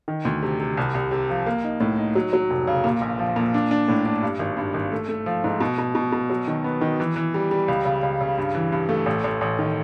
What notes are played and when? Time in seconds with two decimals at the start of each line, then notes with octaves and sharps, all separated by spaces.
0.08 D#3
0.25 D2
0.43 C3
0.60 C3
0.77 C2
0.94 C2
1.11 C3
1.30 F3
1.46 A#3
1.64 D#4
1.80 A2
1.98 D#4
2.15 F#3
2.33 F#3
2.50 F1
2.67 C#3
2.84 A#2
3.01 A#1
3.19 F3
3.36 A#2
3.54 D4
3.71 D4
3.88 A2
4.05 D4
4.22 G2
4.39 G#1
4.57 G2
4.74 G#1
4.92 A3
5.09 A3
5.26 F3
5.44 G#2
5.60 B2
5.78 B2
5.95 B2
6.12 B2
6.30 F#3
6.47 D#3
6.64 B3
6.81 D#3
7.00 E3
7.16 E3
7.34 G3
7.51 G3
7.68 C#2
7.85 C#3
8.03 C#2
8.21 C#3
8.38 G2
8.55 E3
8.72 G2
8.89 A3
9.06 A1
9.24 A1
9.41 A1
9.59 D#3